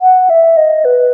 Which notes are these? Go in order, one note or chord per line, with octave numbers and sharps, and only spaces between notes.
F#5
E5
D#5
B4